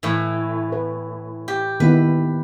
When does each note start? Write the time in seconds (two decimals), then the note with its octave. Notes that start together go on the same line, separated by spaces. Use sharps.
0.03 A2 E3
0.72 B4
1.48 G4
1.80 D#3 B3 E4 B4